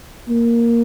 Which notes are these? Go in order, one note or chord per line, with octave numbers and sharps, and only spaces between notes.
A#3